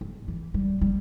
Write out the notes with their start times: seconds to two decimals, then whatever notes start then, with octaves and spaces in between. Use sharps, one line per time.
0.01 G2
0.28 E3
0.54 G3
0.82 G3